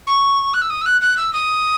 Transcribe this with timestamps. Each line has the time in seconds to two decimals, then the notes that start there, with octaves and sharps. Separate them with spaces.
0.07 C#6
0.54 F#6
0.62 E6
0.70 D#6
0.81 E6
0.86 F#6
1.01 F#6
1.17 E6
1.33 D#6